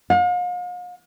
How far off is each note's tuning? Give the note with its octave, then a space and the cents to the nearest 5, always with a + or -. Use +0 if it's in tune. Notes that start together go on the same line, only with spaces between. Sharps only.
F5 +45